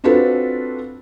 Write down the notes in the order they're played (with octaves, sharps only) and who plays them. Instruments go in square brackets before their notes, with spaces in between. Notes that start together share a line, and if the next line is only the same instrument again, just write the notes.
[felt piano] C4 D4 F4 F#4 A4 B4